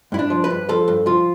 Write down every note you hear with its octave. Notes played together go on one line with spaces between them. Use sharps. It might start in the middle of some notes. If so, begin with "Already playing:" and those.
G2 E4
D4
F3
B4
G2
F3 A4
G2
F3 F4